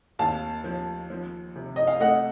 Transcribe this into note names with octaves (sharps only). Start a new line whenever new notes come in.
D#2 F5 A5
F3
F3
C3
D#5
F5
A3 D#5 F#5